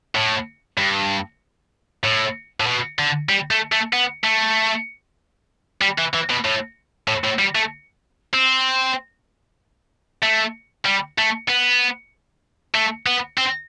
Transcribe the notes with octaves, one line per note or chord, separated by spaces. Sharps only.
A2
G2
A2
A2
B2
D3
G3
A3
A3
B3
A3
G3
E3
E3
B2
A2
A2
A2
G3
A3
C4
A3
G3
A3
B3
A3
B3
C4